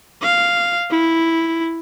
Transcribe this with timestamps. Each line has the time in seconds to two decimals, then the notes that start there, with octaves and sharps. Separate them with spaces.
0.22 F5
0.91 E4